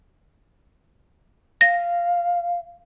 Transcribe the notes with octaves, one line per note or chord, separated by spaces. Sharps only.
F5 A#6